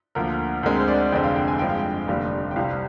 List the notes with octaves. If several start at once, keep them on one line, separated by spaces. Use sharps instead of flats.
D2 D3 F3 A#3 A#4
D2 D3 G#3 C4 A#4
C5
D5
F1 F2 D3 G#3 C4 G5
F5
G5
G#5
G2 F3 G#3 C4 G5
F5
G5
F1 D#2 D3 G3 F5
G5
C2 C3 G3 C4 F5